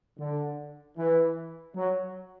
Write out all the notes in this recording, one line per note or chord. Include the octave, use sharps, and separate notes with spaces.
D3
E3
F#3